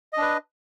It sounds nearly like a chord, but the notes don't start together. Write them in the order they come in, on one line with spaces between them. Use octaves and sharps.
D#5 D4 B4